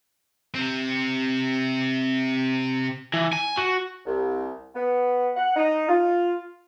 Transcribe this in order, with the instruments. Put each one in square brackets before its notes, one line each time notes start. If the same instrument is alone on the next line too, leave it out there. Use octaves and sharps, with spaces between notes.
[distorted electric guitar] C3 C4
[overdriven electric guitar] E3
G#5
F#4
[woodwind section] C2
B3
F#5
D#4
F4